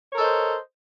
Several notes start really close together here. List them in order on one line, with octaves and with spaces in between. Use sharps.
C#5 A#4 A4 D#5 C5